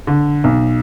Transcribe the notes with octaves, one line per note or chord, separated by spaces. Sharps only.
D3
B1